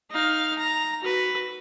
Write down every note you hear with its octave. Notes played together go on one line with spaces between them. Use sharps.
D#4 F5
A#5
F#4 B4